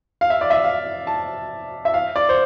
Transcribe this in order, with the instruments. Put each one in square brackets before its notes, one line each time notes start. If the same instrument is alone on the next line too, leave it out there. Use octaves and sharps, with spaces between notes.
[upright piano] F5
E5
D5
E5
F5
A5
E5
F5
D5
C5